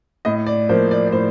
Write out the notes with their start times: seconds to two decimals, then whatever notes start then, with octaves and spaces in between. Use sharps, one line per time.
0.25 A2 D#5
0.46 D5
0.69 F3 A#3 C5
0.91 D5
1.07 D5
1.12 A2 C5